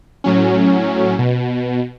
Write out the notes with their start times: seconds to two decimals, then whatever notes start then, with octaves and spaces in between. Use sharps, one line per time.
0.24 A2 F#3 C#4
1.19 B2